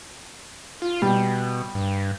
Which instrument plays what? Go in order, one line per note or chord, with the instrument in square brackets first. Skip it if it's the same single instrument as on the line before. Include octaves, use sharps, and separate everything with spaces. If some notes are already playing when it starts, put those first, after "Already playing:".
[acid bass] F4
[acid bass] B2 [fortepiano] G3
[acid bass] G2